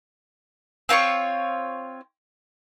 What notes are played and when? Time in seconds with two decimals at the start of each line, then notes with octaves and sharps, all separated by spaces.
0.89 C4 F4 C#5 C#6